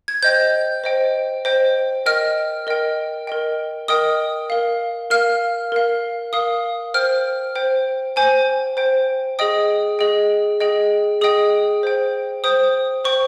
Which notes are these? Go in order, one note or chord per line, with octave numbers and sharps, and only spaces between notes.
G#6
C5 D#5 G5 G6
C5 D#5 G5
C5 D#5 G5
A#4 D#5 G5 F6
A#4 D#5 G5
A#4 D#5 G5
A#4 D#5 G5 D#6
A#4 F5
A#4 F5 F6
A#4 F5
A#4 F5 D#6
C5 G5 F6
C5 G5
C5 G5 G#5
C5 G5
G#4 D#5 G5 D#6
G#4 D#5 G5
G#4 D#5 G5
G#4 D#5 G5 D#6
C5 G5
C5 G5 D#6
C5 G5 C#6